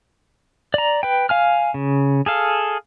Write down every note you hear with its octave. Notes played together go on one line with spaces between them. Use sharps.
D5 A#5
B4 G5
F5 G#5 F6
C#3
G#4 A4 F5